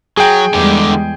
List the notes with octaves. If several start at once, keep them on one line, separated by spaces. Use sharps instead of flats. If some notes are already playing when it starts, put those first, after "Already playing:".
F#3 G#4 G5
E2 D3 G3 G#3 G4